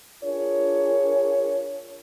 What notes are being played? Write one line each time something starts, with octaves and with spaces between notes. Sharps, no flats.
D4 F4 G#4 A#4 C#5